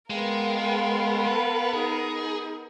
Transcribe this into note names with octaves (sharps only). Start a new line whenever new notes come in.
G#3 B3 A#4 F5 G5 C6
B4
D#4 G#4